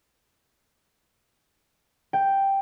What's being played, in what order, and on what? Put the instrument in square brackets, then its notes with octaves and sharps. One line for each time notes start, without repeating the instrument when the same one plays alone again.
[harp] G5